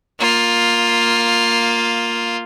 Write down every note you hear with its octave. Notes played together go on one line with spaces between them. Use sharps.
A#3 F4